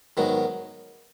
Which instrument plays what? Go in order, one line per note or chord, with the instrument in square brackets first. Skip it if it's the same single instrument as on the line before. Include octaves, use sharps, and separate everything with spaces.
[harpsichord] G#2 D#3 F#3 B3